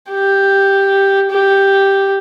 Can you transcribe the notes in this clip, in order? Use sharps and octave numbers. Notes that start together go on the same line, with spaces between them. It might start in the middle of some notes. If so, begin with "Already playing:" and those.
G4
G4